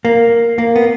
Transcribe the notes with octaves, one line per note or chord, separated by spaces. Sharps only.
A#3
A#3
B3